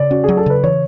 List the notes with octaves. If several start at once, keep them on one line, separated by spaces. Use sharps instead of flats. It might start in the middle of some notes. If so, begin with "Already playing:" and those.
Already playing: C#3 D5
C#4 F#4
F#3 G#4
A4
C#3 B4
E3 C#5